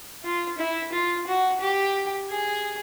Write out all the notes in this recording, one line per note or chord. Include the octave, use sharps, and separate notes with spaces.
F4
E4
F4
F#4
G4
G#4